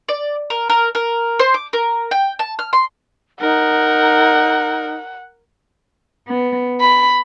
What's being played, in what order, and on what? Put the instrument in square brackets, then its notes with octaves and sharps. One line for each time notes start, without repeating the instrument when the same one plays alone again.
[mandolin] D5
A#4
A#4
A#4
C5
D6
A#4
G5
A5
F6
C6
[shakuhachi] D#4 [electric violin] A#4 [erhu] F#5
[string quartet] B3
B5